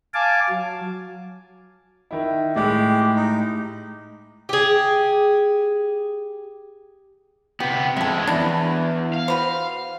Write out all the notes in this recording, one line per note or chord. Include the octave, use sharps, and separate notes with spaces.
F5 G#5 A5 D6
F#3
D#3 E4
A2 G#3 G4
D#4
G4 G#4
C3 B3 G4
F2 G#3 A4 E5
E2 D4 E4
F5
F#4 B4 C5